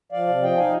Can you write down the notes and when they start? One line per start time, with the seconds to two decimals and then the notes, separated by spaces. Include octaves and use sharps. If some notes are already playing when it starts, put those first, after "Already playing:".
0.12 F3 D5 F5
0.27 C3
0.43 F3 D#5 G5
0.57 D#4 F5 G#5